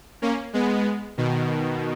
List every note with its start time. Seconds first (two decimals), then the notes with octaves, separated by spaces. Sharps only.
0.22 A#3 C#4
0.53 G#3 B3
1.18 B2 D#3